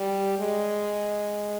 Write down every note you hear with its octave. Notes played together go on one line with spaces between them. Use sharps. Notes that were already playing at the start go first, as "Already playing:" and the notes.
Already playing: G3
G#3